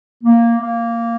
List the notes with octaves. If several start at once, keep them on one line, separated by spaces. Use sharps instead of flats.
A#3
A#3